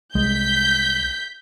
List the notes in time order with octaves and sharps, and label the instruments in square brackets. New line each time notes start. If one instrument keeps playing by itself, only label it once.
[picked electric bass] C2 G#3 [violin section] G6 B6